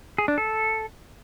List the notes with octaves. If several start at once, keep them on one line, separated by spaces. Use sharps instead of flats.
G#4
D4
A4